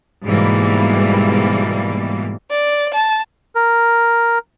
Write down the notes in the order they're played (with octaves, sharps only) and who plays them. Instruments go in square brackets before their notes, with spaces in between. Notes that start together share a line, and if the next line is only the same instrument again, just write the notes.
[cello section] G#2 B2 E3 G3 A#3
[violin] D5
A5
[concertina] A#4